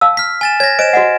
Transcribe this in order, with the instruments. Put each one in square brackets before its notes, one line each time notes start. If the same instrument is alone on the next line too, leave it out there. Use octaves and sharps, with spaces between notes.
[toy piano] F5 A5 E6
[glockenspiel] F6 B6
G#5 A6 E7
[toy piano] C#5 [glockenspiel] G#6 A#6
[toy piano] C5 D#5 [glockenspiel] D7 E7
[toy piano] F#4 D#5 F#5